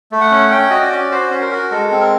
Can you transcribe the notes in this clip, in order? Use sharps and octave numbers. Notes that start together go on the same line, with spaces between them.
A3
F#5
C#4
C#4 G5
F#4 D#5
D5
C#4
F#4 C5
C#4
A#4
F#4
G#3 A4
C4
A#4